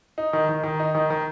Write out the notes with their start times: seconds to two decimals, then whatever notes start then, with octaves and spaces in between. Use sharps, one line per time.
0.18 D#4
0.33 D#3
0.49 D#3
0.64 D#3
0.80 D#4
0.95 D#3
1.10 D#3